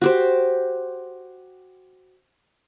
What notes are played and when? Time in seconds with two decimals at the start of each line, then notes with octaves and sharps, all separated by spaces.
0.01 F#4 G4 C5